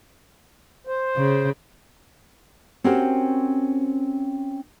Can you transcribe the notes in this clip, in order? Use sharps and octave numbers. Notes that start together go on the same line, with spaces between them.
C5
C#3
C4 C#4 F#4 G4 A#4 C5